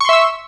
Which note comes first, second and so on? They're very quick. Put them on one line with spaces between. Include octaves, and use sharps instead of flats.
C#6 C6 E5 E6